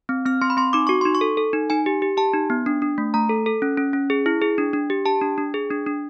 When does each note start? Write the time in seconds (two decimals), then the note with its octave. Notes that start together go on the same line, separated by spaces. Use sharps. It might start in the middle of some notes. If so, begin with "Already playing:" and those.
0.09 C4
0.26 C4 F6
0.41 C4 C6
0.50 B5
0.57 C4 C6
0.73 D#4 D6
0.87 F#4 C#6
1.01 D#4 C6
1.15 C#6
1.21 A4
1.37 A4
1.53 D#4
1.70 D#4 G#5
1.86 G4
2.02 G4
2.17 G4 A5
2.34 D#4
2.50 B3
2.66 D4
2.82 D4
2.98 A3
3.14 A3 A#5
3.29 A4
3.46 A4
3.62 C#4
3.77 C#4
3.93 C#4
4.10 G#4
4.26 E4
4.41 G#4
4.58 D4
4.73 D4
4.90 G4
5.05 G4 A5
5.21 D4
5.38 D4
5.54 G#4
5.71 D4
5.86 D4